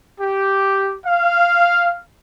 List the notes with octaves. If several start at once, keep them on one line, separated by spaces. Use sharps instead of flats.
G4
F5